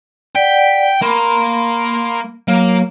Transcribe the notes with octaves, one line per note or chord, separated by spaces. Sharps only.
D5 F#5 G5 B6
A#3 B5 C6
F#3 A#3